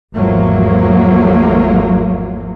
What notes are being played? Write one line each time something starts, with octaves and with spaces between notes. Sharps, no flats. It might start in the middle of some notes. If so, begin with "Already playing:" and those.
G#1 E2 F3 F#3 A3 A#3